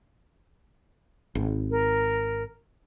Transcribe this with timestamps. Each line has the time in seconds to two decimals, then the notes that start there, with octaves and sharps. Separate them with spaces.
1.35 G#1
1.71 A#4